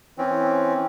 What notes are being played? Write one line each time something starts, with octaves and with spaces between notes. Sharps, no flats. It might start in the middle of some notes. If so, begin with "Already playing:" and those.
E3 C4 C#4